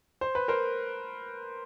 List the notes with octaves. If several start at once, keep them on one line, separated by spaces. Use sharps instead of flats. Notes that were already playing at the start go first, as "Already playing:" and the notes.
C5
B4
A#4 C5